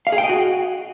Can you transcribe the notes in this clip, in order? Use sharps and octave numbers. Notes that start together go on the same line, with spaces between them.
F5
G#4
G5
D#5
F#4